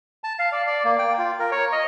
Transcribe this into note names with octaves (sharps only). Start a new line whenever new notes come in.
A5
F5
D5
D5
A#3
G5
F4
A#4
C#5
D#5